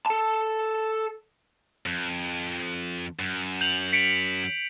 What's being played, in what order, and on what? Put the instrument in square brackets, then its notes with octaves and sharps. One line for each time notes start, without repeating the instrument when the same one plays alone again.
[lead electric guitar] A4 A5
[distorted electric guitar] F2
F#2
[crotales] G6 F7 F#7
B6 C#7 D7